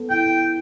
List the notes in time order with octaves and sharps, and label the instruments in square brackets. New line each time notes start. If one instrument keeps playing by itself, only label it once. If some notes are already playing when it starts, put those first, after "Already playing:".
Already playing: [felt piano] B3 A4
[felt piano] E4 [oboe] G5